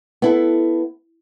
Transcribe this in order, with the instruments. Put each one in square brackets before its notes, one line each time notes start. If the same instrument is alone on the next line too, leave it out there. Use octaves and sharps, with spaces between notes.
[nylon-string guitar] B3 E4 A4